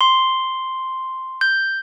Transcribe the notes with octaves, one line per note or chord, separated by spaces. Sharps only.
C6
G6